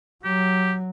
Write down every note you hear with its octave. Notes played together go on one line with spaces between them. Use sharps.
F#3 G4